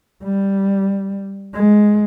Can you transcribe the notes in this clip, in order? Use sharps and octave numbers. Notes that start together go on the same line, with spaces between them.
G3
G#3